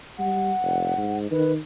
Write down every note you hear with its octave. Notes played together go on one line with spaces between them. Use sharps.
G3 F#5
F1
G#2
D#3 B4